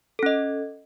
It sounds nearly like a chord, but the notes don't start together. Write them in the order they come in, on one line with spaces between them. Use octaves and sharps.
A4 C#4 D#5